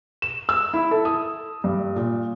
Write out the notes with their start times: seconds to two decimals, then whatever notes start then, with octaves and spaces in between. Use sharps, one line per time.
0.22 E7
0.49 E6
0.73 E4
0.91 A4
1.05 D#6
1.64 G2
1.96 A#2